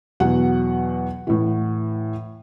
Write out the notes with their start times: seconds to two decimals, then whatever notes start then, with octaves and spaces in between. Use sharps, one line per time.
0.20 E2 B2 F#3 F#5
1.27 A2 E3